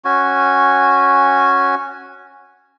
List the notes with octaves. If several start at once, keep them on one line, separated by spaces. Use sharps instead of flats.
C#4 F#4 G#5